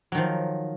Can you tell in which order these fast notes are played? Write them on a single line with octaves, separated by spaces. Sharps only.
F#3 D#3 F3